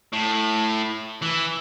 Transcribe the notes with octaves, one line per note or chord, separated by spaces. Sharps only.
A2
E3